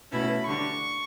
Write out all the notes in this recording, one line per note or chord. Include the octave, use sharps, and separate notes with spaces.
B2 A3 C#4 E4 B5
D3 G3 D4 C#6